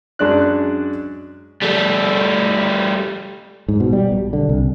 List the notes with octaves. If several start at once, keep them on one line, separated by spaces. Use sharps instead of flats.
F#2 G#3 D4 D5 F#6
G3 A3
G#2
B2
G3
B1
D3
C2